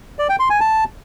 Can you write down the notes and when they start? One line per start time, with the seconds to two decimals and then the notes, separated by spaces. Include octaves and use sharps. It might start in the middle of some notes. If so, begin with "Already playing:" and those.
0.19 D5
0.29 G5
0.40 C6
0.50 G#5
0.60 A5